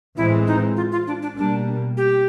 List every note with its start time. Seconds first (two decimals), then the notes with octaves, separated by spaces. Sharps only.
0.17 A2 E3 G#3 C4 E4
0.47 D#4
0.76 F4
0.92 F4
1.07 D4
1.22 D4
1.37 B2 G3 A#3 D4
1.97 G4